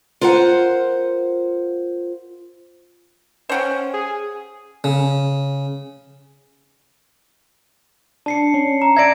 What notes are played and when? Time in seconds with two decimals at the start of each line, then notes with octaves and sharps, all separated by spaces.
0.21 F4 A#4 C5 F5 F#5
3.49 C#4 C5 F#5 G5
3.94 G#4
4.84 C#3
8.26 D4 A5 C7 C#7
8.54 C#4
8.82 A#5
8.97 D5 E5 G#6 A#6 D7